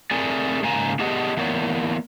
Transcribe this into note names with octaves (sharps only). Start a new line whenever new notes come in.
A3 C4 G#4 A#4 D5 G#5
G#2 C#3 A#3 G#5 A#5
B3 D4 G4 G#4 D#5 F#5
E3 A#3 B3 C#5 D5